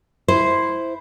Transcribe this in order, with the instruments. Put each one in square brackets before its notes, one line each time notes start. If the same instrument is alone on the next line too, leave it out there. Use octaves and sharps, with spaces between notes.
[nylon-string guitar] E4 C5